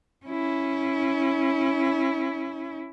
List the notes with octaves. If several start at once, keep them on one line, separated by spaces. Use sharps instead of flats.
C#4 E4